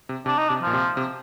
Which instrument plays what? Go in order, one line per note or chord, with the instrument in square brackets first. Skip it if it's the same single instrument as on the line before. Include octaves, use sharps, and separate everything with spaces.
[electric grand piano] C3
[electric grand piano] C3 [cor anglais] D4
[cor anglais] D#4
[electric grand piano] C3 [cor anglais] D4
[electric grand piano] A#2 [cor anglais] F3
[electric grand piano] C3
C3